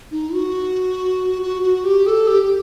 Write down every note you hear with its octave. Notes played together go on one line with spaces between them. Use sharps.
D#4
F#4
F#4
F#4
G4
A4
G4
G4